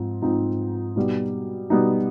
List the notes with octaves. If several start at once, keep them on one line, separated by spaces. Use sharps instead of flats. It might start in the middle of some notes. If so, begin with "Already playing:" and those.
Already playing: G#2 F3 C4
G#2 F3 C4 D#4
B2 G3 B3 D#4
B2 G3 B3 D#4